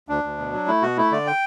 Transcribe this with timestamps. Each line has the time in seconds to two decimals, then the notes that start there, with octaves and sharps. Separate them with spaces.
0.09 D2 D4
0.23 D2
0.38 B2
0.53 F#3
0.67 A3 E4
0.82 B2 F#4
0.97 A3 E4
1.11 D3 D5
1.27 G5